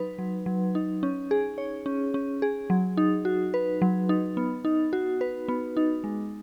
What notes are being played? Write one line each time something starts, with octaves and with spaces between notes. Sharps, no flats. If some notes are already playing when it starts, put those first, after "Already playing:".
Already playing: F#3 D#4 B4
F#3
F#3
D#4
C#4
G#4
C#5
C#4
C#4
G#4
F#3
D#4
F#4
B4
F#3
D#4
B3
D#4
F#4
B4
B3
D#4
G#3